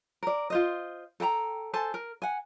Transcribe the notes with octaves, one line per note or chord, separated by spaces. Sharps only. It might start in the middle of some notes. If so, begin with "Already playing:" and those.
A#4 D5
F4 C5 D#5
A4 G5 A5 A#5
A4 C5 G#5 A5
A#4
F#5 G#5